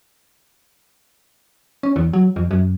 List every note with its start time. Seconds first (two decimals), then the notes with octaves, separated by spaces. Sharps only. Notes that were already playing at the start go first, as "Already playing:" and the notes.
1.83 C#4
1.96 E2
2.13 F#3
2.36 F2
2.51 F#2